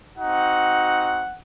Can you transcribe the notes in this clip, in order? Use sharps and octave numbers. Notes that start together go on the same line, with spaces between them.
C4 D#4 F#4 F#5